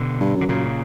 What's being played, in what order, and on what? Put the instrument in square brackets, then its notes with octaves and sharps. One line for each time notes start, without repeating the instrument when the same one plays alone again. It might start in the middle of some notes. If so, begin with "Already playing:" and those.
Already playing: [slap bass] B2 D3
[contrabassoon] G2
F#2
[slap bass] D3
[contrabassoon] F#2 [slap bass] A#2 C#3